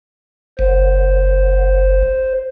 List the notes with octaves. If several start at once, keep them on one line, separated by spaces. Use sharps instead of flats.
F#1 C5